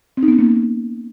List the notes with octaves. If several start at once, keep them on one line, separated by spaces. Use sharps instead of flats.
C4
D#4
B3
C#4
A#3